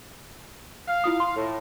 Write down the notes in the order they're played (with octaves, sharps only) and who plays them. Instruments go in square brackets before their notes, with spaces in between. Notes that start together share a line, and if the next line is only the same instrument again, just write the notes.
[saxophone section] F5
[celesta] E4 F4 D#6
C6
[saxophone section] A2